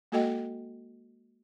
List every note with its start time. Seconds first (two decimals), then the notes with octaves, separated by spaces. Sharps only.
0.12 G#3 A#3 F#4 A4 D#5 G5